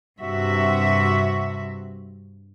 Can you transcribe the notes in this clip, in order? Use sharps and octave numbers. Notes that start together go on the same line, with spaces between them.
G2 C3 F#4 E5